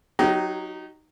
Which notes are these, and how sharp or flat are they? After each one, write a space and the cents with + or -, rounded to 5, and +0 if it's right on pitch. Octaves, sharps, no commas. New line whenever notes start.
F#3 +0 D#4 +0 G4 -30